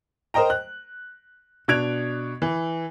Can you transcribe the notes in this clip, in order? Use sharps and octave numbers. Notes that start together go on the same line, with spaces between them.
A#4 C5 D#5 G5 A#5
F#6
B2 D4 F#6 G#6 D7 F7
E3